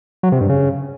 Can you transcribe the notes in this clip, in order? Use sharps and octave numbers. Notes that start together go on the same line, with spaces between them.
F#3
C3
G2
C#3